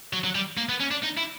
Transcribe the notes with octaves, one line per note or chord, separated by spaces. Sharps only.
F#3
F#3
G3
A#3
B3
C#4
D4
D#4
E4